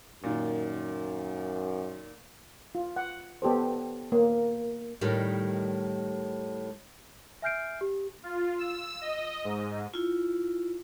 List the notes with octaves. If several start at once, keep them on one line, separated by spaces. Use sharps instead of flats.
F#2 A#2 D#3
F4
F#5
B3 G4 A4 C5
A#3
A2 D#3 G3
E5 G#5 F6 G6 C7 D7
G4
F4
E6
D#5
G#2
E4 F4